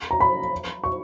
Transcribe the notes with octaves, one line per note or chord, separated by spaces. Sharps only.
A#5
B5
C#6